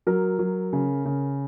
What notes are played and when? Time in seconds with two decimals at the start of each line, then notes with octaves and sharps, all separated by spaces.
0.07 F#3 A#4
0.39 F#3
0.73 C#3
1.05 C#3